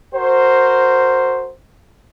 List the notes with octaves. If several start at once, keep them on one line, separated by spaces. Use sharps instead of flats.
F#4 A#4 C5